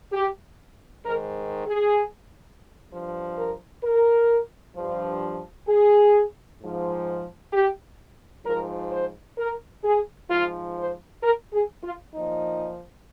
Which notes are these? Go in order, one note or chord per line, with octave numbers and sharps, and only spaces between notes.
G4
G#2 D#3 A#4
G#4
G2 F3
A#4
A#4
G2 F3
G#4
G#2 F3
G4
G#2 F3 A#4
C5
A#4
G#4
G#2 F3 F4
C5
A#4
G#4
F4
A#2 F3 D#4